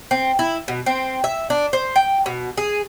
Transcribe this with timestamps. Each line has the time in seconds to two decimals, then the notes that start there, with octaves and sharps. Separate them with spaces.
0.11 C4
0.39 E4
0.68 B2
0.86 C4
1.24 E5
1.50 D4
1.73 C5
1.96 G5
2.26 B2
2.57 G#4